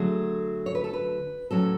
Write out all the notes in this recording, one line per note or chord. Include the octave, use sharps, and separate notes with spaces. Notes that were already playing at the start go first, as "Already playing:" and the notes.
Already playing: D3 F#3 A3 G#4
C#5
B4
A4
B4
A2 F#3 C#4 A4